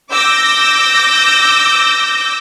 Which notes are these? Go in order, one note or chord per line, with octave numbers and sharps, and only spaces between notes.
D6 E6 G6 A#6